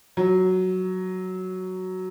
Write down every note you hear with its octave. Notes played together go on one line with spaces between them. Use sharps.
F#3